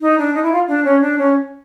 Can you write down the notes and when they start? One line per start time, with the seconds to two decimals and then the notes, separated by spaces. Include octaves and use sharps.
0.01 D#4
0.18 D4
0.34 D#4
0.42 E4
0.51 F4
0.67 D4
0.84 C#4
1.01 D4
1.18 C#4